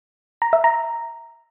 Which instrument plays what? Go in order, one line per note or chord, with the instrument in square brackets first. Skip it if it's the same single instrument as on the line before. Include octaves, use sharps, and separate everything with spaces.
[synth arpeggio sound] A#5
E5
A#5